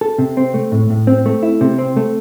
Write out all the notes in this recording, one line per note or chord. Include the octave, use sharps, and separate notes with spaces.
A4
C3
C4
A3
A2
A2
C4
A3
E4
C3
C4
A3